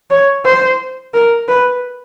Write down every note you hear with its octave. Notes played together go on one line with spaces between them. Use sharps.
C#5
C5
A#4
B4